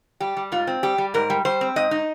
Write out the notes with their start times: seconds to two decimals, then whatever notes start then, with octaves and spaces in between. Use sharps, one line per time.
0.20 G3 G4
0.37 G3
0.52 G#2 F4
0.67 C4
0.83 G3 G4
0.98 G3
1.14 G#2 A#4
1.30 G3
1.45 G3 C5
1.61 C4
1.76 G#2 D#5
1.91 D#4